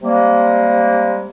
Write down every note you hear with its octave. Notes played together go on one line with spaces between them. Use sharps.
C3 G3 G#3 A#3